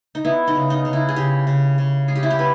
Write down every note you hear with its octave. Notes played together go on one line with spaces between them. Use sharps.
D#4
B3 E4
D#4
C#3
D#4
C#3
E4
G#4
C#3 G4
C#3
C#3
G#3 G#4
G4
E4
G4
B3 B4